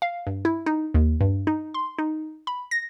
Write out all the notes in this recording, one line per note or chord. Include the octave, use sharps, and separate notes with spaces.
F5
G2
E4
D#4
D#2
G2
D#4
C6
D#4
B5
A#6